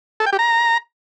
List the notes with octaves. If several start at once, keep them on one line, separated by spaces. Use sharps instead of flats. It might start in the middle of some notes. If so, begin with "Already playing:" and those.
A4
G5
G4
A#5